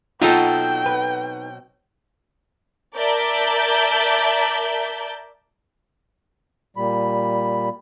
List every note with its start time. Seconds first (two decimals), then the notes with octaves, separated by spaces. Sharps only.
0.22 B2 F#3 C4 D#4 F4 A4 G5
0.86 B4
2.95 A#4 D5 E5 A5 G6
6.77 A#2 G3 B5